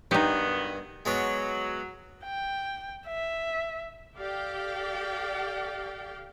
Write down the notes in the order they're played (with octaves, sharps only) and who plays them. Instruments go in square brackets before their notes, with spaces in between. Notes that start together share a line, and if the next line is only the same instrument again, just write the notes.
[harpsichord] G2 [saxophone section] D#3 F#3 B3 [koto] D#4 G4
[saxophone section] F#3 [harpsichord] G#3 B3 C#5
[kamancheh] G5
E5
[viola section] G4 A4 D5 F5 G5